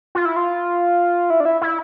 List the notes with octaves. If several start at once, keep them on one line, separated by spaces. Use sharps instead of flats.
F4
E4
F4
E4
D4
E4
E4